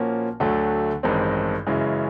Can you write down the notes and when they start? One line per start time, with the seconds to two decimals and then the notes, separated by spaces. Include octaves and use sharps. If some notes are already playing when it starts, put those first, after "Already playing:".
Already playing: A#2 F3 A#3 C#4 F#4
0.40 D2 D3 F#3 A3 D4
1.03 A1 G2 D#3 G#3 C4
1.67 F#2 C#3 E3 G#3